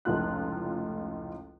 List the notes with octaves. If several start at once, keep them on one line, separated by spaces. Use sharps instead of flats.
F1 C#2 A2 F4 F#6